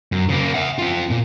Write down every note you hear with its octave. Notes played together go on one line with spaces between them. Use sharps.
F#2
C#3 A#3
E5 F#5
C4 F4
A#2